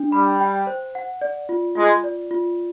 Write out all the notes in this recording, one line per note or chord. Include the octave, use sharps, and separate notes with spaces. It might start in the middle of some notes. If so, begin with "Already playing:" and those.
Already playing: D4
G3 B5
G5
C5
F#5
D5
F4
G#3 F4
D5
F4